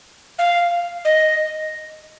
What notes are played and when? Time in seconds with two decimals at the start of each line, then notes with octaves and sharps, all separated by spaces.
0.39 F5
1.05 D#5